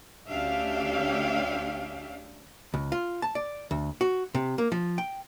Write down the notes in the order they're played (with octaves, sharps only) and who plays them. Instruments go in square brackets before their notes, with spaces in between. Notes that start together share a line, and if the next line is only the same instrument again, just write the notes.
[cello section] D2 C#4 D4 G4 E5 F5
[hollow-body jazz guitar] C#2
F4
A5
D5
D2
F#4
C3
A#3
F3
G5